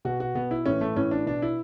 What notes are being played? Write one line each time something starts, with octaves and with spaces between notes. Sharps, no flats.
B2 F#4
F#4
B2 B3
E4
A2 E3 C#4
A3
A2 E3 C#4
D4
B2 D4
E4